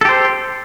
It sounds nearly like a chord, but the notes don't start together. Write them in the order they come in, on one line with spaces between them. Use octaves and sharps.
A4 G4 C5